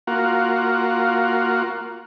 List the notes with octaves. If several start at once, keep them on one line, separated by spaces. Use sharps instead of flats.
A#3 F4 F#4